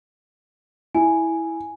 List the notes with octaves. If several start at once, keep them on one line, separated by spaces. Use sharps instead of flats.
E4 G#5